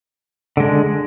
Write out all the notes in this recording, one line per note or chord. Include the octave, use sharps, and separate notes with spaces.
D3 G#3 D4